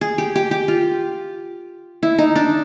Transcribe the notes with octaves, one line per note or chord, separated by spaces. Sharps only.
G#4
G4
G4
G4
F4
E4
D#4
D4